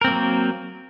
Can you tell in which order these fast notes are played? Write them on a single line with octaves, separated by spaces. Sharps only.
A#4 C4 A#3 F#3